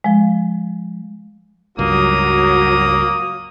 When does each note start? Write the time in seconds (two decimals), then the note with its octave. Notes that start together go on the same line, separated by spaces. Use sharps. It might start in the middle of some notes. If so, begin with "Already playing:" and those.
0.04 F3 G#3
1.79 C#2 G2 F#3 A#3 D#6